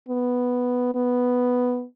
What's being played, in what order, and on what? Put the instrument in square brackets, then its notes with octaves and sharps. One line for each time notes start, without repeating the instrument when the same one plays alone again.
[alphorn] B3
B3